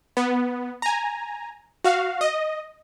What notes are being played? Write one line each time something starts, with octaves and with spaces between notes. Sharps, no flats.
B3
G#5 A#5
F#4 F5
D#5